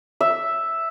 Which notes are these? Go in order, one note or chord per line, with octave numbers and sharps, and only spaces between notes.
E5